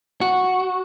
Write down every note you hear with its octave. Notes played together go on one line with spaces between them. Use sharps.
F#4